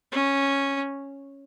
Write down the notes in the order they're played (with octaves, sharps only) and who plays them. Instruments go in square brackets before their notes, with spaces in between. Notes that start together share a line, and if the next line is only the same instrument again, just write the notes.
[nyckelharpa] C#4